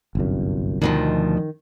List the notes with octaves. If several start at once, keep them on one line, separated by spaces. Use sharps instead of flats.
G1 C2 F#2
D2 B2 D#3 F3